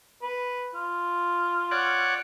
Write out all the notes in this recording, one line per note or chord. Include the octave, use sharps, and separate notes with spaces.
B4
F4
C#5 D5 F#5